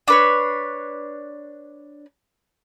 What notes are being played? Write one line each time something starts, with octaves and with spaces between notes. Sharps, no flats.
D4 B4 C#5